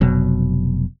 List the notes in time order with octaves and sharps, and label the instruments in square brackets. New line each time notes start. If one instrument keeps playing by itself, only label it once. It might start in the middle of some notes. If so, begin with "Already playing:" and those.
[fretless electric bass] F1 B2 F#3